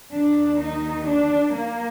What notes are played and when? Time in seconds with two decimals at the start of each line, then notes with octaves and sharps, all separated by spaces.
0.11 D#2 D#3 D4
0.58 D#4
1.05 D4
1.53 A#3